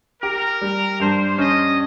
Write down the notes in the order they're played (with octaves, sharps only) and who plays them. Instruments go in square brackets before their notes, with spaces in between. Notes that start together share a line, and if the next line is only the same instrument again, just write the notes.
[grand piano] G4 [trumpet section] A#4
[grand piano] G3
[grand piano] G2 [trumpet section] C5
[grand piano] C#4 [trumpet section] D#5